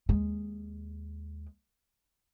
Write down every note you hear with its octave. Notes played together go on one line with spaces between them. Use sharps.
D#2 G#3